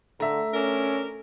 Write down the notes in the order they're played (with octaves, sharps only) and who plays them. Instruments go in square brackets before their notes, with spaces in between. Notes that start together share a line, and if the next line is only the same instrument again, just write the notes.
[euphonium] D3 [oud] A3 [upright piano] E5 A#5
[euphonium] C#4 [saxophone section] D4 A#4